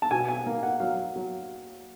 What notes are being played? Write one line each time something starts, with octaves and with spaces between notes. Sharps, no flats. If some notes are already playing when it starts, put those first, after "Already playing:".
A5
B2 G#5
G#5
A#3
F#5
F#3 F5
F#3